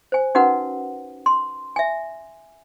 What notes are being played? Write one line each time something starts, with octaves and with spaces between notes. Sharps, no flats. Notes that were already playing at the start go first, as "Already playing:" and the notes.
C5 G#5
C#4 D#4 F#4 A#4 B4 F#5
C6
E5 G#5